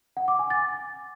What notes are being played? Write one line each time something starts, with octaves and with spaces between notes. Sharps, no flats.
F#5
D6
G#5
A6